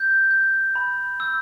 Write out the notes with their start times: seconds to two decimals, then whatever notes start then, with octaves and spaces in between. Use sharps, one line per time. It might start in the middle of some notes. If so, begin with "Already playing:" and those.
Already playing: G6
0.31 G6
0.75 B5
1.20 E6 G6